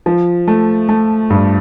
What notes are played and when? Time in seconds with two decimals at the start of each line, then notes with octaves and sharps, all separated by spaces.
0.06 F3
0.48 A3
0.89 A3
1.30 G2